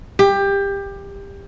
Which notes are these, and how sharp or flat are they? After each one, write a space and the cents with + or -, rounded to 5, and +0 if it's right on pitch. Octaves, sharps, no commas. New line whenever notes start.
G4 +20